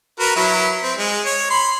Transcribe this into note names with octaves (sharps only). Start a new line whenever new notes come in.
F#4 A#4 B4
F#3 E4 B4
C4
G#3
C#5
B5 C6